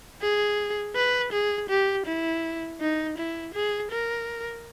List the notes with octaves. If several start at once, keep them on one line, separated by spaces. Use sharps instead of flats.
G#4
B4
G#4
G4
E4
D#4
E4
G#4
A#4